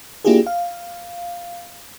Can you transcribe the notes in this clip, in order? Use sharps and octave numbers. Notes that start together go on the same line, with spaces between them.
A#3 D4 E4 F4 G4 G#4
F5